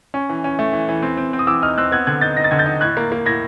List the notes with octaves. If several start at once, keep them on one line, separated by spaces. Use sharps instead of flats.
C#4
E3
C#4
A3
E3
E3
C4
C4
C4
D#6
E3 D6 E6
D#4 D#6 F6
C4 E6 F#6
B3 F#6 G#6
D3 F#6 G#6
D#4 G6 A6
D#4 A#6
A6
D3 G#6
G6 A6
D#4
A2 F#6 G#6
A#3
A#3
A2 G#6 A#6